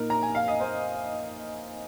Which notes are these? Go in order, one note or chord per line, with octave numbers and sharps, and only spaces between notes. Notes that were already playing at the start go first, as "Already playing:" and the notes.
Already playing: A#2 A#3 D#4 A#4
A#5
G#5
F5
D#5
C5